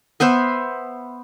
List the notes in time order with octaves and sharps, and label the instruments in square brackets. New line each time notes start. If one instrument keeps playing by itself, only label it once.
[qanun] B3 B4 C5 E5